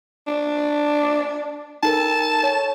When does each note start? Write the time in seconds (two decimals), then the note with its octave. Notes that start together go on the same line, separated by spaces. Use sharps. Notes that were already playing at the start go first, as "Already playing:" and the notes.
0.27 D4
1.83 D#4 A4 A#4 A5
2.43 C#5